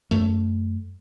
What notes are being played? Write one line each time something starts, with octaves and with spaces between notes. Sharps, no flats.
F#2 A3